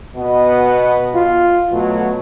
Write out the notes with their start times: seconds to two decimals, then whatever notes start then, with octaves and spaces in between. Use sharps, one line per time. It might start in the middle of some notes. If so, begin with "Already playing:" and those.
0.17 B2 B3 D#5
1.14 F4
1.72 B2 F#3 A3